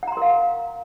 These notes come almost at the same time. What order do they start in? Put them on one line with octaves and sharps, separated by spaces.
F#5 A#5 C6 A#4 F5